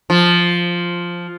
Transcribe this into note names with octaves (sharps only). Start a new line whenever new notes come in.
F3